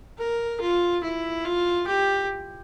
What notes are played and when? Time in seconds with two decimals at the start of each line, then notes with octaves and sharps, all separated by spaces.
0.19 A#4
0.61 F4
1.04 E4
1.45 F4
1.87 G4